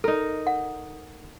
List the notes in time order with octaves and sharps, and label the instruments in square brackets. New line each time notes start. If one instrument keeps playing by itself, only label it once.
[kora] D#4 A#4 [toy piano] A4
[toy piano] F#5